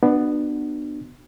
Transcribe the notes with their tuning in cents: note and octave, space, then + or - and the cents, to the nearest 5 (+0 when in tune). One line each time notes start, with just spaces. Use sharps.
B3 +0 D4 +25 F#4 +0